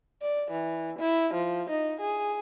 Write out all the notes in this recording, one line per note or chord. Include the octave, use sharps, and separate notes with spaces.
D5
E3
E4
F3
D#4
G#4